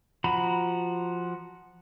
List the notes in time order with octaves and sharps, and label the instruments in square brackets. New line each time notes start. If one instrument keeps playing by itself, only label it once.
[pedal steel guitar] F3 F#4 A#5 B5